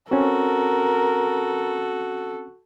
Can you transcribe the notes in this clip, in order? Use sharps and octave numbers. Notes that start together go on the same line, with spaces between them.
C4 C#4 F#4 A4 A#4